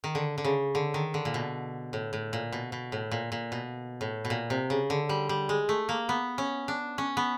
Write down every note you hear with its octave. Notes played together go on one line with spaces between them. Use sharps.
D#3
D3
D3
C#3
D3
D#3
D3
A#2
B2
A2
A2
A#2
B2
B2
A2
A#2
A#2
B2
A2
B2
A#2
C3
C#3
D3
G3
G3
G#3
A3
A#3
B3
C#4
D4
C#4
B3